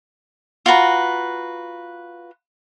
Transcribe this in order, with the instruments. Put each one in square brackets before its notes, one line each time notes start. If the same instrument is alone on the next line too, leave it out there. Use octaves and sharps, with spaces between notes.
[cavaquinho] F4 F#4 B4 A#5